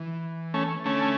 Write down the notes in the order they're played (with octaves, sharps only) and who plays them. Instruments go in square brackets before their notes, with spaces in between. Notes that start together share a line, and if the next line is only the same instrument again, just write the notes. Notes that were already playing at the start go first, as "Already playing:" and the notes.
Already playing: [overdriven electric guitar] E3
[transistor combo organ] A3 C#4
[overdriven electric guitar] D3 [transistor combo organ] A3 C#4